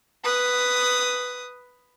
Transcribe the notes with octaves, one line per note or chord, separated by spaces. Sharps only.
B4 D#6